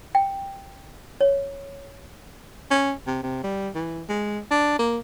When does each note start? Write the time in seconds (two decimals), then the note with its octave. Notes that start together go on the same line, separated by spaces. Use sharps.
0.15 G5
1.21 C#5
2.71 C#4
3.07 C3
3.23 C3
3.43 G3
3.75 E3
4.09 G#3
4.51 D4
4.79 A#3